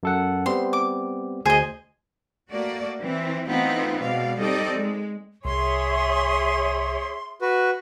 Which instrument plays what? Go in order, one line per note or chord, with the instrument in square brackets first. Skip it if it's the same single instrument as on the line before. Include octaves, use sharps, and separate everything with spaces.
[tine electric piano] F#2 A4 F#5
[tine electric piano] G3 B3 C4 [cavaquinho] C6
[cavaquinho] D6
[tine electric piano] D2 C5 G#6 [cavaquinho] G#4 D#5
[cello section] A3 A#3 F#4 D5
E3 C4
E3 A3 B3 C4 D#4 F4
B2 G#3 D5 F5
G3 C4 D#4 A4 D5 D#5
G#3
[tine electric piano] C2 [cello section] G#4 C#5 E5 [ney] C6
[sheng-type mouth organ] F#4 B4